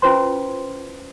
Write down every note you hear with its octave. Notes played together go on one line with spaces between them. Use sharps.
C#4 E4 F4 B4 C5 C6